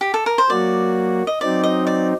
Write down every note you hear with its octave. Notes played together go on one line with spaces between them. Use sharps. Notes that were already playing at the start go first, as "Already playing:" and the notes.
G4
A4
A#4
C5
F#3 A#3 F#4 D5
D#5
F#3 C4 D#4 D5
D#5
D5